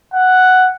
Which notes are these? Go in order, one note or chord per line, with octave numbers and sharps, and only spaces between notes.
F#5